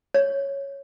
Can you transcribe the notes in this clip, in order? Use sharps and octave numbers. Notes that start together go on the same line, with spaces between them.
C#5